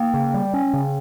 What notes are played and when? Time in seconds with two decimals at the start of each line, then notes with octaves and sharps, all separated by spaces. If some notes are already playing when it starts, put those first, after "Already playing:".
Already playing: A#3 G5
0.14 C#3
0.34 G3
0.54 C#4
0.73 C#3